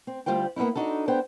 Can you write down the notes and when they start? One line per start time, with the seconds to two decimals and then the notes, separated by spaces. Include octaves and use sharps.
0.07 C4
0.26 D2 G#2 G3 F4 C5 G5
0.56 A#3 B3 C#4 D#4 E4
0.75 D4 D#4 F#4 A4
1.08 B3 C5 G5